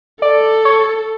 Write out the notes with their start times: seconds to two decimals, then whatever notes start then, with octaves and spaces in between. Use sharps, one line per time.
0.22 A4 D5
0.65 C#5